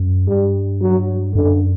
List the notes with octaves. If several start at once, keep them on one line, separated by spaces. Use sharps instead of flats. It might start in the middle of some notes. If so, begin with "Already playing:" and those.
Already playing: F#2
G2 G3
F#3
F#2 D3